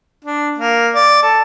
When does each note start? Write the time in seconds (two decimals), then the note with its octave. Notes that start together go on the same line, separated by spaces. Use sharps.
0.24 D4
0.58 A#3
0.95 D5
1.23 A4